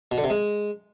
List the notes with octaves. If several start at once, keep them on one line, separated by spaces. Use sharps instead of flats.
B2
D3
C3
G#3